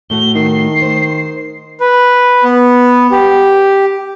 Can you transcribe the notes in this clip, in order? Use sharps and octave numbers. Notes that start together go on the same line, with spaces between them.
A2 A3 F#4 G7
D#3 C7
C5
B4
B3
G4